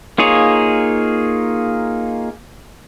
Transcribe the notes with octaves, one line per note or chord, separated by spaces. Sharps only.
A#3 D#4 F4 G#4 C#5